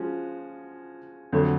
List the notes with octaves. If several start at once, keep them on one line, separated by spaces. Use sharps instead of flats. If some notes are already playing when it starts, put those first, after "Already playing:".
Already playing: F3 G#3 C#4 F#4
F2 D3 F#3 A3